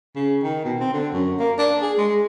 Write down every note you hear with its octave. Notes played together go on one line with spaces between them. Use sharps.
C#3
D#3
B2
C4
D3
F#2
A#3
D4
G#4
G#3